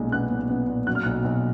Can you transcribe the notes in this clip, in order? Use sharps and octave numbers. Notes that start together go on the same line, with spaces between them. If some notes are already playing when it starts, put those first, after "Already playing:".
Already playing: B1 A#2 G#3
B3 F#6
B1
B3
A#2
F#3 F#6
F6
B1 F#6
B1